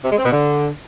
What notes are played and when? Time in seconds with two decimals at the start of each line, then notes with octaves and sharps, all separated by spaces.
0.04 C3
0.11 G#3
0.18 C4
0.25 B2
0.32 D3